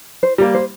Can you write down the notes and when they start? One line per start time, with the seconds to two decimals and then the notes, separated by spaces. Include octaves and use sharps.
0.23 C5
0.38 G3 A#3
0.54 C5